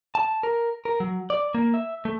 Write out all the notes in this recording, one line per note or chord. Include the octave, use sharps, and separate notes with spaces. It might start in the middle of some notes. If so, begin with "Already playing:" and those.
A5
A#4
A#4
F#3
D5
A#3
E5
A3